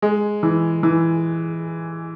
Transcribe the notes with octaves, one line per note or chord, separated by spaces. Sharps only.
G#3
E3
E3